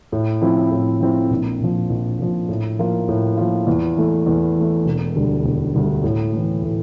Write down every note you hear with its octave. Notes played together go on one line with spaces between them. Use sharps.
A2
F3 C4 E4
A2
F3 C4 E4
A#1
A#2 F3
A#1
A#2 F3
A2
F3 A#3 F4
A2
F3 A#3 F4
E2
E3 A3
E2
E3 A3
E1
D2 D3 G3
E1
D2 D3 G3
A2
E3 A3
A2